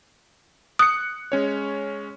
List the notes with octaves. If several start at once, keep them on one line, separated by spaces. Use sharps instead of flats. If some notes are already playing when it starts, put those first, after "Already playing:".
D#6 F#6 C#7
G#3 C#4 C#5